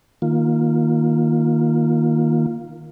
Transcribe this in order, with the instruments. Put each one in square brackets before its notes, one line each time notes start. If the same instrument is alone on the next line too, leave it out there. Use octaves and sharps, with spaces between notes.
[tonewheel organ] D#3 A#3 F4